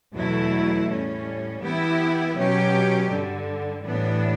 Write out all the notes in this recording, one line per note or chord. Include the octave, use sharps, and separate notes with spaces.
E2 B2 F#3 A3 E4
A2 G3 C#4
E3 B3 E4 G4
B2 F#3 C#4 G4
G2 D3 G3
A2 E3 G3 B3 D4